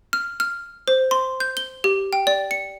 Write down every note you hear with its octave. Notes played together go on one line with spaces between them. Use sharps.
F6
F6
C5
C6
G6
G7
G4
G5
D5
C#7